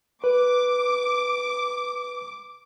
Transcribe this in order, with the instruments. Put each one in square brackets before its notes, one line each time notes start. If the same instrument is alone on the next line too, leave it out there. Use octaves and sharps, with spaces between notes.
[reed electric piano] B4 [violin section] D6